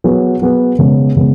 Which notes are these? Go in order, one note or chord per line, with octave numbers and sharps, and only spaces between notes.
F#3 B3 G#4 B4
F#3 B3 G#4 B4
C#3 G#3 B3
C#3 G#3 B3